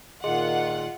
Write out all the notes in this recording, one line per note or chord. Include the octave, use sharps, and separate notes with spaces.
A#2 D#3 F4 G#4 D#5 F#5 C6